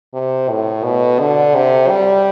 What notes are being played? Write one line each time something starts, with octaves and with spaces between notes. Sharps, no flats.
C3
A2
B2
D3
C3
G3